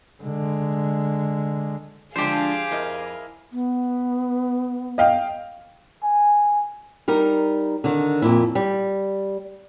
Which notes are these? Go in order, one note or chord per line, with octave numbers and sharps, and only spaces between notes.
D3 G#3
D3 F3 G#3 D4 G4 G#4 C5 F5
F2 E4 A#4 D#5
B3
D#5 F5 G5
G#5
G3 D#4 A#4
D3 D#3
F2 A#2 E4
G3